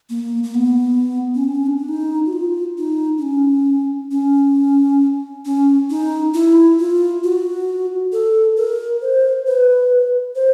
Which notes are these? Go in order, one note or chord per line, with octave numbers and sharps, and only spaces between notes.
A#3
A#3
B3
C#4
C4
C#4
D4
D4
D#4
F#4
F4
D#4
D4
C#4
C#4
C#4
D#4
E4
F4
F#4
A4
A#4
C5
B4
C5